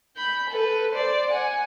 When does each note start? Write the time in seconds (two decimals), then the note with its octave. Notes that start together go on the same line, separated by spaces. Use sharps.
0.17 B5 G6
0.50 A4 B4
0.92 C5 D5
1.30 F#5 G#5